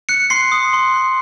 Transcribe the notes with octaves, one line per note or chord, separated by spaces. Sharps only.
F#6 C#7
C6 C7
D#6
C6
F#6